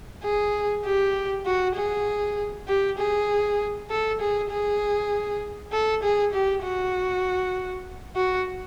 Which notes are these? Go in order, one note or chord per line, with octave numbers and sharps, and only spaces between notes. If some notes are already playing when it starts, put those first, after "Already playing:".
G#4
G4
F#4
G#4
G4
G#4
A4
G#4
G#4
A4
G#4
G4
F#4
F#4